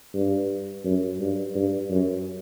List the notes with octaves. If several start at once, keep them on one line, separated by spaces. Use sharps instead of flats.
G2
F#2
G2
G2
F#2